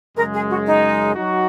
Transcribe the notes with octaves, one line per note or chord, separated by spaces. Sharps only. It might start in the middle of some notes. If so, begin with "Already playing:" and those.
F#2 C#3 G#3 A#4
G#4
F#4
D#4
F#3 D#4 F#4